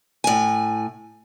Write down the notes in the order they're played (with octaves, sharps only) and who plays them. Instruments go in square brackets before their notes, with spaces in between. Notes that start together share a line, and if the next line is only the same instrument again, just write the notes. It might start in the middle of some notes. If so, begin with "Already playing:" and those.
[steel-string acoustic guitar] A2 G#5